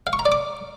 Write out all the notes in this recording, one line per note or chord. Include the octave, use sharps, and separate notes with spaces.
F5
C#6
A#5
D5
D6